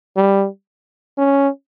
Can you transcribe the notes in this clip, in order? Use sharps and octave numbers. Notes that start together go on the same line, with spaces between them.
G3
C#4